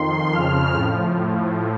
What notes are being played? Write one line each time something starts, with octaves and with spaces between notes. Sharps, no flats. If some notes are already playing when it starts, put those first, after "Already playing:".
Already playing: F2 D#3 C6
F2 C#3 F3 F6
A2 F3
A2 F3